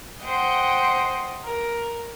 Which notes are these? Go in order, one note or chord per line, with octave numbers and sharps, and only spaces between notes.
C5 D#5 F#5 G5
A#4